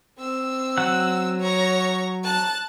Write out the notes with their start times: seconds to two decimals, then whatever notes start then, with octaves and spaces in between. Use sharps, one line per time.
0.18 C4 E6
0.78 F#3 F#5
1.40 C#5 A#5
2.24 A5 F#6